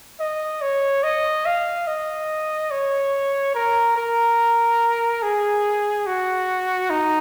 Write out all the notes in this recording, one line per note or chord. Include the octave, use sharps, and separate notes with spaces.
D#5
C#5
D#5
F5
D#5
C#5
A#4
A#4
G#4
F#4
D#4